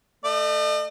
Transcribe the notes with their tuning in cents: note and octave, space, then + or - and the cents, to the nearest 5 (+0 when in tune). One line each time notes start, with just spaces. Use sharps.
A3 +0 D#5 -45